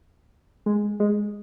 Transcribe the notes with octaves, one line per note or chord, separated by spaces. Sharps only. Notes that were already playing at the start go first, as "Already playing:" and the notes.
G#3
G#3